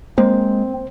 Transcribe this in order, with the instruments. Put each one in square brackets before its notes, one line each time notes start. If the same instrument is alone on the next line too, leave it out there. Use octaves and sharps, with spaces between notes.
[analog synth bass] G#3 [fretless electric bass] A#3 [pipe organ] C4 [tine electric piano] C5